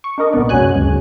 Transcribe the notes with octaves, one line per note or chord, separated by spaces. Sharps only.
C#6
D4 D#4 A#4 D#5
C2 A#2 B3 D5
F#2 G#3 C#4 F#4 G#5 F#6
D2 G2 C#3